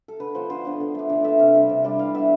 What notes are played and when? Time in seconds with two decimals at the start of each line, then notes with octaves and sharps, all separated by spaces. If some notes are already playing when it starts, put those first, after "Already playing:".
0.08 A4
0.20 D3 B4
0.35 F3 B3 D4 C5
0.50 D3 C5
0.65 F3 B3 D4
0.80 D3
0.95 A3 D4
1.09 D3 D5
1.24 A3 D4 E5
1.39 C3 F5
1.54 G3 D4
1.70 C3
1.84 G3 D4
1.99 E3 F5
2.14 B3 D4 E5